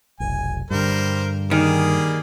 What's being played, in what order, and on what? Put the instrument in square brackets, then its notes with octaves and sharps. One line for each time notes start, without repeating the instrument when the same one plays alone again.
[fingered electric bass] F1 B1 [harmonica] G#5
[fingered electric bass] G2 D3 [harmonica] G3 A#4 C5
[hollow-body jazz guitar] D#3 [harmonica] G3 A#3 G#4